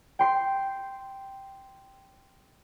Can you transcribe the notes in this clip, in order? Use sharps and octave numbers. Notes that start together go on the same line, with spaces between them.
G5 C6 C7